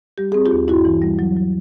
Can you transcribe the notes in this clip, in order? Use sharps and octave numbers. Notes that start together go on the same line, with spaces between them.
G3 G4
C4 G#4
F4 G4
D#2
G2 E4 F#4
E3
G3
F#3
F#3